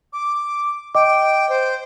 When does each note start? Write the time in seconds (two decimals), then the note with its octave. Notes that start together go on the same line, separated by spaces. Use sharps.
0.13 D6
0.95 D#5 G5 D6
1.49 C5